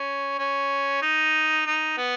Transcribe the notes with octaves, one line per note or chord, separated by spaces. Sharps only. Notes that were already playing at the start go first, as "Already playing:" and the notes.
Already playing: C#4
C#4
D#4
D#4
B3